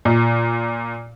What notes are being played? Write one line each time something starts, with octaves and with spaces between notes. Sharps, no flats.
A#2